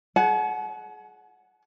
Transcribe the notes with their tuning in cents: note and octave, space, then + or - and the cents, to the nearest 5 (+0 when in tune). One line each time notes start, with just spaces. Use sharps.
G#4 +25 F#5 +0 A5 -45